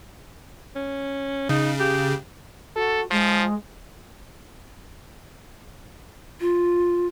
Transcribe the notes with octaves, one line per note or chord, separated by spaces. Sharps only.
C#4
C#3 D#4
G4
F#4 A4
F3 G#3
F4